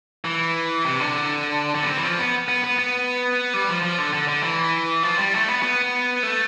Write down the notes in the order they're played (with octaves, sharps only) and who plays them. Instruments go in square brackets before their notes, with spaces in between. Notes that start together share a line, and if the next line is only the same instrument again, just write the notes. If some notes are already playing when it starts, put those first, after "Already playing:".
[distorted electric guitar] E3
C3
D3
D3
B3
C4
E3
F3
B3
B3
B3
B3
G3
F3
F3
D3
D3
D3
E3
F3
G3
A3
B3
B3
A3